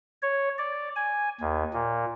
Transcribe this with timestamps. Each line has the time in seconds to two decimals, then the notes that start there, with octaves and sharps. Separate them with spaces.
0.22 C#5
0.58 D5
0.96 G#5
1.41 D#2
1.73 A#2